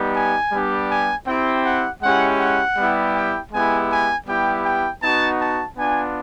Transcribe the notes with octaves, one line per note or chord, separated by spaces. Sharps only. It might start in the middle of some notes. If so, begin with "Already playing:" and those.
Already playing: G3 B3 D#4 G4
G#5
G3 B3 D4 G4
G#5
C4 E4 G4 G5
F#5
G#3 C#4 E4 G4 F#5
F#5
G3 B3 E4 G4
G5
G#3 B3 E4 G4 G#5
G#5
G3 B3 E4 G4 G5
G5
B3 D#4 F#4 A5
A5
B3 D4 F4 G#5